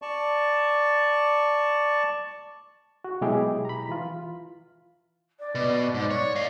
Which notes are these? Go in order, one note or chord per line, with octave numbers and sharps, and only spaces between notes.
D5 A5 C#6
F#4
B2 F#3 G#3 E4 G4 G#4
A#5 B5
E3 F4
D5
B2
G#2 D5
C#5
D#5 F5